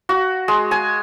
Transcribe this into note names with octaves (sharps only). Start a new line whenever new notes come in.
F#4
G#3
G#5